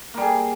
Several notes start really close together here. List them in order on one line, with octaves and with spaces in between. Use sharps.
A#3 G3 G#4